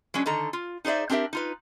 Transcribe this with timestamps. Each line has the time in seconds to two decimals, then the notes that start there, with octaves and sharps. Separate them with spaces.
0.14 F#3 G#3 C#4 D4
0.26 D3 D#3 A4 A#5
0.53 F4
0.85 D#4 G#4 C5 D5 E5
1.10 C4 D4 G4 A#4 E5
1.33 D#4 F4 B4